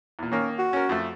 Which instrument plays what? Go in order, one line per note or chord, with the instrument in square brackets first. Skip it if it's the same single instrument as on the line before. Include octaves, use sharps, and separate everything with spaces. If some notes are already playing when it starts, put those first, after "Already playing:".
[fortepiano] E2 A#2
[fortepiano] D#3 A#3 A#4 [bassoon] C#4
[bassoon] F#4
[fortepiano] C#4 A#4
F2 A3